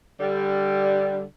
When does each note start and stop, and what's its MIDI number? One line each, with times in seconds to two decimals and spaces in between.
0.20 1.23 50
0.20 1.23 55